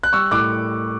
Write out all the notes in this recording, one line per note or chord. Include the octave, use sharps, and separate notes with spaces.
F#6
G3 C#6 E6
A2 D6 F#6